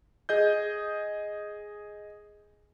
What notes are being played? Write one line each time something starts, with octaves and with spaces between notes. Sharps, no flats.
G#4 D#5 G6